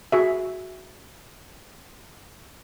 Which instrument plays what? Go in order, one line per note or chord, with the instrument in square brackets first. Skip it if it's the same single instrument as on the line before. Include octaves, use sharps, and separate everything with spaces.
[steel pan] F#4 G#4 E5